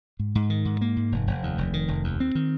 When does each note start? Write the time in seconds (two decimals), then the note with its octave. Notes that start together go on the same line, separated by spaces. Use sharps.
0.19 G#2
0.35 G#2
0.50 D#3
0.65 G#2
0.81 A#3
0.97 G#2
1.12 F1
1.27 F1
1.43 D#2
1.58 F1
1.73 D#3
1.88 F1
2.04 D#2
2.20 C4
2.35 D#3